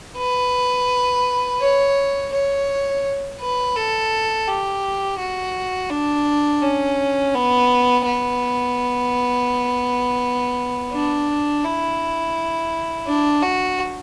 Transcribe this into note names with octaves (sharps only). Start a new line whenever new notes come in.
B4
C#5
C#5
B4
A4
G4
F#4
D4
C#4
B3
B3
D4
E4
D4
F#4